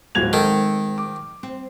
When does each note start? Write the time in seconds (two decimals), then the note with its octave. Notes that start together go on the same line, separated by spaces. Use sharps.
0.15 D1 G#2 G#3 C4 G#6 F7
0.33 D#3 A4
0.98 D6
1.43 C4